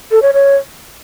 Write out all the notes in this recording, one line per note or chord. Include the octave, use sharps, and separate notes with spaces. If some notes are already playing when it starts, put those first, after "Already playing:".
A4
C#5
C#5